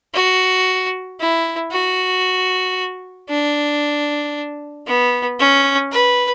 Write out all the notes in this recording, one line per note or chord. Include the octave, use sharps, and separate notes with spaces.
F#4
E4
F#4
D4
B3
C#4
B4